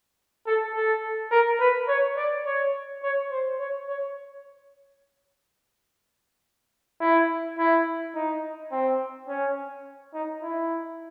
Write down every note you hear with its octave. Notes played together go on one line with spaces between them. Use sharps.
A4
A4
A#4
B4
C#5
D5
C#5
C#5
C5
C#5
C#5
E4
E4
D#4
C4
C#4
D#4
E4